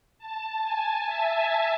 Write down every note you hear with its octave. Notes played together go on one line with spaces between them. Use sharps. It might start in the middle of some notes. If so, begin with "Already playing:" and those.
A5
G#5
E5